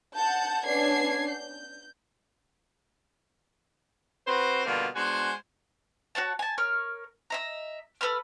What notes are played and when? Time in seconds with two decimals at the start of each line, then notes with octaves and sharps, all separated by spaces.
0.15 F#5 A5 G6
0.66 B3 C#4 D4 G#6 C7
1.30 G6
4.27 C4 F#4 B4 C5
4.66 B2 D3 G3 A#3 B3 F4
4.95 G#3 B3 D4 F#4 C5 G#5
6.15 F#4 C#5 F#5 A5
6.39 G#5 A5
6.58 A#4 C#5 F6
7.30 D#5 E5 A#5
8.01 A4 B4 B5 F6